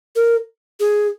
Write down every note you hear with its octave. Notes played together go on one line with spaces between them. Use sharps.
A#4
G#4